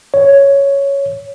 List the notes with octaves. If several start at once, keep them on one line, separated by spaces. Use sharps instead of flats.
C#5